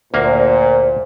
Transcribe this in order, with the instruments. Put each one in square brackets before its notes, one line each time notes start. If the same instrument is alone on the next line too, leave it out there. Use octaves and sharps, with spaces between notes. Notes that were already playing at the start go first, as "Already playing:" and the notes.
[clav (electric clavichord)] D2 A#3 [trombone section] A#2 [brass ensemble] C5